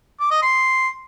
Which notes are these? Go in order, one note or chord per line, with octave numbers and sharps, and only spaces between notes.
D6
D#5
C6